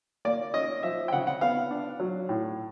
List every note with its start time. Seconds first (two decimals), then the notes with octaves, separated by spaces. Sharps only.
0.25 A#3 D5
0.54 C#4 D#5
0.83 F3 E5
1.08 G5
1.12 C#3 F#5
1.27 F#5
1.41 B3 F5
1.71 D4
2.00 F#3
2.29 A2